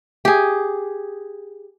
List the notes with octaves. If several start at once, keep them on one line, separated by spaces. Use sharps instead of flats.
G4 G#4